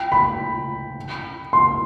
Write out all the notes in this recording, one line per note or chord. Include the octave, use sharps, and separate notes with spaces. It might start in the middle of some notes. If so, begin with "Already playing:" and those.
Already playing: G5
B5
C6